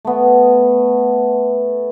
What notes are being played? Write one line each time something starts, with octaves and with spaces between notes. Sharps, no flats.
A3 B3